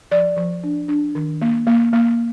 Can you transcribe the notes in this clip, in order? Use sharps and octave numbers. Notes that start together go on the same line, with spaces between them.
F3 D5
F3
D4
D4
D#3
A#3
A#3
A#3